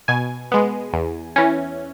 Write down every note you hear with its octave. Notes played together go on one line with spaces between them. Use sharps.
B2 G#5
G#3 B3
E2
E3 C#4